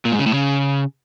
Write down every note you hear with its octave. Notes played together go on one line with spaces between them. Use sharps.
A#2
G#2
C#3
A2
C#3